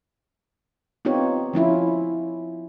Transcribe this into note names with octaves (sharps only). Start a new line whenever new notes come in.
B3 C4 D#4 F4 G4 C#5
F3 C#4 E4 F4